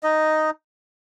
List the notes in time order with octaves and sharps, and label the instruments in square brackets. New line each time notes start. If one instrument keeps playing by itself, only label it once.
[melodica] D#4 D#5